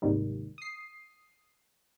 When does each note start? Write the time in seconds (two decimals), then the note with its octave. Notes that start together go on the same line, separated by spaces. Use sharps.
0.02 G#1 D#2 G#2 C3 D#3 G3
0.58 D#6 C7